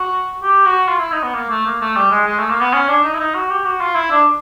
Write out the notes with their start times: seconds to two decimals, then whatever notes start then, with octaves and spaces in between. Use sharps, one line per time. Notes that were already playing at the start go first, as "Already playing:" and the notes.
Already playing: F#4
0.42 G4
0.65 F#4
0.88 F4
1.00 E4
1.12 D#4
1.23 B3
1.34 A#3
1.50 A3
1.65 A#3
1.81 A3
1.96 G3
2.11 G#3
2.26 G#3
2.39 A3
2.50 A#3
2.61 B3
2.73 C#4
2.88 D4
3.03 D#4
3.13 E4
3.19 D#4
3.34 F#4
3.50 G4
3.65 F#4
3.80 F4
3.95 E4
4.11 D4